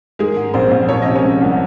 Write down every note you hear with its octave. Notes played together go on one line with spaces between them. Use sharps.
D#3 G#3 G#4
G#2
A#1 C4 C5
A#1
F3 C#5
C3 D#5
C#4 C#5
G#3
C2